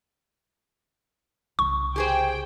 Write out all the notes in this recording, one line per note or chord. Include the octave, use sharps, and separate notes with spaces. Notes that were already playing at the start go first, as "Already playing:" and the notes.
C2 C#3 C#6
G4 G#4 C5 G5